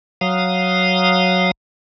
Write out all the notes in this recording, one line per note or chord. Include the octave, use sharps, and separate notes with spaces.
F#3 F5 D#6